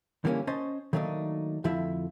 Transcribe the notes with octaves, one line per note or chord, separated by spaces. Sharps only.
D3 E3 G3 A#3 C4 C#4
C#4 C5 D#5 A5
D#3 F#3 A3 A#3 D4 D#4
F2 D3 F3 A3 E4 E5